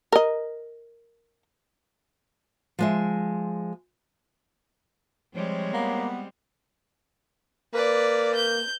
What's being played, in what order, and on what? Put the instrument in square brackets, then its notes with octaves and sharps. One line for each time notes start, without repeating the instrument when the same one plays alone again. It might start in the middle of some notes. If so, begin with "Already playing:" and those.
[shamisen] A#4 D#5
[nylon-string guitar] F3 G#3 E5
[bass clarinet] F3 [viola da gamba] G3 G#3 C4 [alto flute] C#5
[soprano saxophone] A#3 [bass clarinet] B3
[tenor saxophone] A#3 [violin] B4 D5
[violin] G6